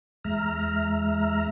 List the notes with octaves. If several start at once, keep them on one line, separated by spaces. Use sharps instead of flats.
E2 G#3 E5 A#5 F6